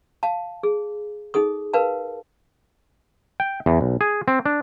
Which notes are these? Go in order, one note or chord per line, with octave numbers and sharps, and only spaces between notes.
F5 A5
G#4
D#4 G#4 A4 D#6
A#4 B4 F5 A5
G5
E2
B1
G#4
C4
D4